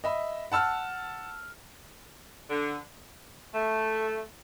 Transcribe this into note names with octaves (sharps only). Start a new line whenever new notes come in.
D#5 E5 B5
F#5 A5 E6 F6
D3
A3